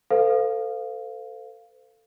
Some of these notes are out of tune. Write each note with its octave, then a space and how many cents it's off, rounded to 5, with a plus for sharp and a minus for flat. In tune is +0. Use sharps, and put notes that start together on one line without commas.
A4 +25 C5 -40 F5 +0